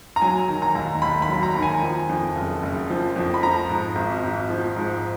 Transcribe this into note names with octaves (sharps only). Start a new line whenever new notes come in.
A#5
F#3 G#5
D#3
A#5
D#2
D#2 B5
B5
F#3
A#5
D#3
G#5
F3
F2
F#1
F#1
F3
F2
B5
F3 A#5
G#2
G#1
G#1
F3
G#2